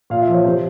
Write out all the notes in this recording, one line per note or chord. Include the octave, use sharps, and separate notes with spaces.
A#2 F5
E5
F3
C#5
C3 C5